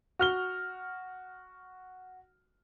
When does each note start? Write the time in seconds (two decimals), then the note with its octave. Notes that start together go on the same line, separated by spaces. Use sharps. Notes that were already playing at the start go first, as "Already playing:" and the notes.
0.19 F#4 F6 G7